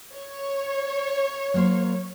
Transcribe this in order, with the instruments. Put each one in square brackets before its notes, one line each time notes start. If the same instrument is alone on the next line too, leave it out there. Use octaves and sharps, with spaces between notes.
[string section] C#5
[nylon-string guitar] F#3 A#3 C5